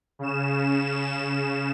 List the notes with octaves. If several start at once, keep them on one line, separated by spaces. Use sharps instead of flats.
C#3 E7